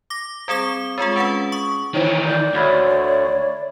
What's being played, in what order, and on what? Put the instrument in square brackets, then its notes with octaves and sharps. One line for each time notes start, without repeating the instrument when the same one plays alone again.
[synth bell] D6 A#6
G3 C4 G#4 D6 G7
G#3 C4 F4 G#4
C#4 G#4 B4 F#5
C#6 D#6
[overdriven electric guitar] D#3 E3 [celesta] C5 C#5
[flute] D5 [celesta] G6
[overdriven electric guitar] D2 [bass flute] C#5 [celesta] E5 B5 G#6